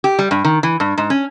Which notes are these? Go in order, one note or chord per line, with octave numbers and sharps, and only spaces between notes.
G4
G3
G2
D#3
E3
G2
G#2
C#4